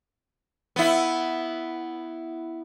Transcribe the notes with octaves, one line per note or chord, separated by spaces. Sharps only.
B3 E4